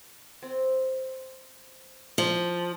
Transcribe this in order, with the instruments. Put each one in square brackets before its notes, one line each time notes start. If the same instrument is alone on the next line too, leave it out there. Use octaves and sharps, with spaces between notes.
[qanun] C4
[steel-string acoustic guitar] F3